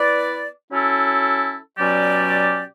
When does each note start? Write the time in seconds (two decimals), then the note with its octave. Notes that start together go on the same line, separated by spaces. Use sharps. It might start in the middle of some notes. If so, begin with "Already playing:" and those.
Already playing: B3 E4 B4 D5
0.69 F#3 C#4 E4 A4
1.77 B2 F#3 C#4 G4 D5